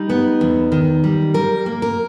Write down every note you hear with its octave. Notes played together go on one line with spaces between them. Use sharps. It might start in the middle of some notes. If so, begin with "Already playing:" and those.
Already playing: G3 D#4
B3
E2
D#3
G3
G3 A#4
A#3
A#4